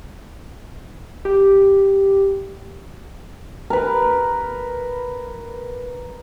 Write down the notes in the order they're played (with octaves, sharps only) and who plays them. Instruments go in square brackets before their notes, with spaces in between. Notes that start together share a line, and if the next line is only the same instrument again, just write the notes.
[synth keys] G4
[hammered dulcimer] A#4 B4